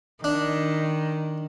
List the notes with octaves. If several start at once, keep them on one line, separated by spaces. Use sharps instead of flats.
D#3 D4